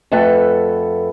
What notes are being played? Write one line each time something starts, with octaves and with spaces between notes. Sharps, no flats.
F2 A3 A4 B4 F#5